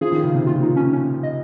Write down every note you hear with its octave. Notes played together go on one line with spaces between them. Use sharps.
F3 G#4
D#3
C#3
C3
A#2 F4
D#4
C#4
C#4
D#5